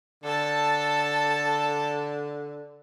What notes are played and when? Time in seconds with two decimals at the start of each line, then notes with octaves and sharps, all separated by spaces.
0.24 D3 A4 A5